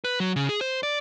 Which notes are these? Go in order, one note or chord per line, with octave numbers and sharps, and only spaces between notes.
B4
F#3
C#3
G#4
C5
D5